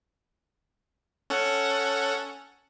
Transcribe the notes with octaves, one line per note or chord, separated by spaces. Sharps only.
C#4 A4 F#5